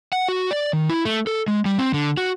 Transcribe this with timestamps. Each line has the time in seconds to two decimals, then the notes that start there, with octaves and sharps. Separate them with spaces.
0.13 F#5
0.28 F#4
0.51 D5
0.73 D#3
0.89 E4
1.05 A3
1.27 A4
1.48 G#3
1.65 G3
1.78 C4
1.94 D3
2.17 F#4